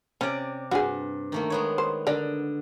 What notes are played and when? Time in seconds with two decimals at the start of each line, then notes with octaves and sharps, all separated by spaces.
0.21 C3 C#4 D5
0.71 G2 F#4 G#4
1.32 D#3 A3 A#3
1.50 G#3 B3 C#5
1.78 C5
2.07 D3 A#4 D5